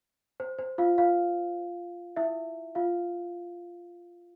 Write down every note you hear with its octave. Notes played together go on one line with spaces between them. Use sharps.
C5
C5
F4 F5
F4 F5
E4 E5
F4 F5